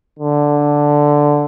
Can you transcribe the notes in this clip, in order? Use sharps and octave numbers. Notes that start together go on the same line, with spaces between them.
D3